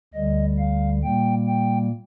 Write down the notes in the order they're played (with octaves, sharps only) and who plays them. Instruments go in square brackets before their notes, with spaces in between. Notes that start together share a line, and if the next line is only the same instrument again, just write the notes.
[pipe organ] D2 D3 G3 D#5
F5
A#2 G3 A#3 G5
G5